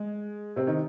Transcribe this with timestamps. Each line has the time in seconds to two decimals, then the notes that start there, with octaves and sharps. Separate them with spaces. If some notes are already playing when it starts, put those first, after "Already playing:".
Already playing: G#3
0.56 C3 C4
0.67 D#3 D#4